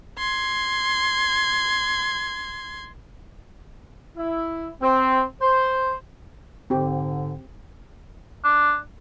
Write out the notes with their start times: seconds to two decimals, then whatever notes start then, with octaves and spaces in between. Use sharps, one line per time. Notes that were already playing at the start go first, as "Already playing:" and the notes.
0.18 C6 G#6
4.17 E4
4.82 C4
5.41 C5
6.70 G#2 D3 C4 G4
8.45 D4